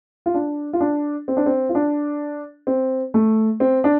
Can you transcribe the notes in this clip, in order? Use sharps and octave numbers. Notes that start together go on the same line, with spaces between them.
F4
D4
F4
D4
C4
D4
C4
F4
D4
C4
A3
C4
D4